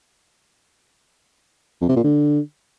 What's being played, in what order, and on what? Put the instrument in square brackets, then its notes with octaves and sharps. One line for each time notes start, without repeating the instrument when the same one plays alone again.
[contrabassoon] F2
C3
A#2
D3